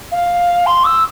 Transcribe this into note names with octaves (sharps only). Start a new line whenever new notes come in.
F5
C6
E6